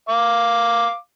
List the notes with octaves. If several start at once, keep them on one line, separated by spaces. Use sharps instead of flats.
F5 D6